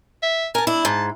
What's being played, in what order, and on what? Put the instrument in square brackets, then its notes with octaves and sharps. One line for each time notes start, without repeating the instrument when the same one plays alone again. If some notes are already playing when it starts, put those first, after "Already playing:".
[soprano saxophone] E5
[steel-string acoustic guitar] A#4 A5 [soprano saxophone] G#5
[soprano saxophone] D4 [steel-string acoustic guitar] E4
[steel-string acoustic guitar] G#2 [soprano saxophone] A5